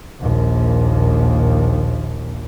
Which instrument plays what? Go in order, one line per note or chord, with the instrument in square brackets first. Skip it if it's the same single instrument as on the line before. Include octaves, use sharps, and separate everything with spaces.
[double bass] A#1 D#2